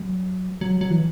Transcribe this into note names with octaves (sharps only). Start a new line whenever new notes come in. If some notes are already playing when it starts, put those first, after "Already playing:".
Already playing: F#3
F#3
F#3
E3